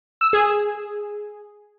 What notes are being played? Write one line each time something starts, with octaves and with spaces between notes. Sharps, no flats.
E6
G#4